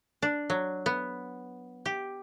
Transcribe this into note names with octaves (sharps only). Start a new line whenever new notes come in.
D4
F#3
B3
G4